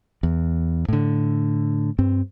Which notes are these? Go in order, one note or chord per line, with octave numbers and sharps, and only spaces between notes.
E2
A2 D3
G2 C4